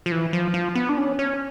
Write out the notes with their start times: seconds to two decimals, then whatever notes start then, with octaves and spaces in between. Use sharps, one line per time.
0.06 F3
0.12 E3
0.33 F3
0.54 F3
0.75 B3
0.89 D4
0.98 C#4
1.19 C#4